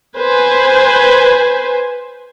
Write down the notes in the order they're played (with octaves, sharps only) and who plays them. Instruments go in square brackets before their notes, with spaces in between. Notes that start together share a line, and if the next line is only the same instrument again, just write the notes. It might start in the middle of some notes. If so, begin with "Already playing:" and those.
[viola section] B4 C5 G#5